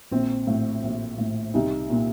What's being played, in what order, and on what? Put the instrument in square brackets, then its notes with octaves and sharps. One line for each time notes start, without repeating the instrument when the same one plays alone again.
[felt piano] A#1 C4
A2
A#1
A2
C2 D#4
A#2